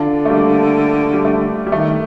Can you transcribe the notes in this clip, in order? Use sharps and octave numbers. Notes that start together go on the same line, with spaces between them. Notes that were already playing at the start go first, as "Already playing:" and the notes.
Already playing: D3 D4 F4
A3
G3 A#3
G3
A3
G3
D#3 A3